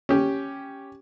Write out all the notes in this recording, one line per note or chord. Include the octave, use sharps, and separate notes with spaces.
C#4 G4